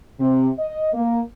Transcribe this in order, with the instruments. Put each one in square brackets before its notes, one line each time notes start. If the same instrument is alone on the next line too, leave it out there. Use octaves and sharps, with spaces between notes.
[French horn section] C3
D#5
A#3